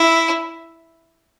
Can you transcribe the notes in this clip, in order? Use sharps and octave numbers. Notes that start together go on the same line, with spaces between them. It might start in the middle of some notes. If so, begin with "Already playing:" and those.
Already playing: E4